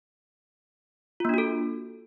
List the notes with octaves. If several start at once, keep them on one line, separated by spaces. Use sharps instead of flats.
A#3 D4 F4 F#4 A4